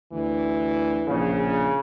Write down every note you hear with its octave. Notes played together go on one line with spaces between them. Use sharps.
D2 E3
A#1 C#3